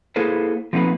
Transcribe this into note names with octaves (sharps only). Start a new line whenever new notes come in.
A#3 E4 G#4 A4 B4 C5
F3 A3 A#3 C4 D#4 B4